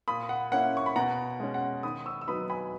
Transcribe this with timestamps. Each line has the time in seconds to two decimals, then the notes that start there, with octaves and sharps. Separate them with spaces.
0.08 A#2 B5 D#6
0.29 F#5
0.51 A#3 C#4 E4 F#5
0.77 C#6
0.86 B5
0.96 B2 F#5 A#5
1.40 G#3 C#4
1.54 F#5
1.83 D#3 B5 D#6
2.06 C#6 E6
2.21 E6
2.28 F#3 B3 D#4 B5 D#6
2.50 G#5 B5